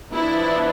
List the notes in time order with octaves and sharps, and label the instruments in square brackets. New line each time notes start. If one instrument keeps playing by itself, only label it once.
[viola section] F3 B3 D4 E4